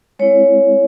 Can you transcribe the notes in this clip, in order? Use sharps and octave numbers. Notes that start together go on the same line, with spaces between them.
G#3 C4 E4 C#5